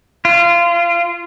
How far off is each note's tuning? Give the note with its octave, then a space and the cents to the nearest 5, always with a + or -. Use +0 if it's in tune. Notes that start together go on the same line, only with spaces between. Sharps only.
F4 -25